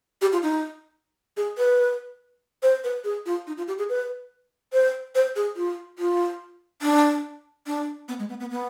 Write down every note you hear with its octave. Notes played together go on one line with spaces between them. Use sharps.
G4
F4
D#4
G#4
B4
C5
B4
G#4
F4
D#4
F4
G4
G#4
B4
C5
C5
G#4
F4
F4
D4
D4
B3
G#3
B3
B3
B3